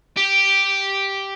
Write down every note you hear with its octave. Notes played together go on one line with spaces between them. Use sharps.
G4